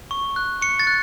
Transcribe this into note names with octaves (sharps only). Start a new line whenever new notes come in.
C#6
F#6
C#6 C#7
A6
F#6